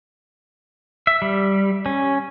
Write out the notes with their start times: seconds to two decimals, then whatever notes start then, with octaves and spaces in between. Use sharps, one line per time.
1.07 E5
1.22 G3
1.86 C#4